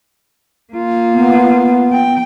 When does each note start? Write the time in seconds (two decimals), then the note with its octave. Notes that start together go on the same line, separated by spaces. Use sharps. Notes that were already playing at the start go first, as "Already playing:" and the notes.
0.73 A#3 F4
1.14 B3
1.93 G5